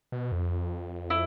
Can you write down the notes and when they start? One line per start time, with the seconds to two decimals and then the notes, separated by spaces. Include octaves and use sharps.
0.12 B2
0.32 F2
1.10 E4